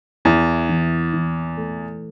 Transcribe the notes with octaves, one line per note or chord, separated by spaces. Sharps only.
E2 E4
E3
E3
A3